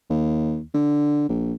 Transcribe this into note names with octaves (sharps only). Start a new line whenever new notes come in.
D#2
D3
A#1